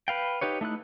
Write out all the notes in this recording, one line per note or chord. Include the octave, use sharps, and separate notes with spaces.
B4 F5 G5
D#4 G4 B4 C#5
A3 D#4 E4 F#6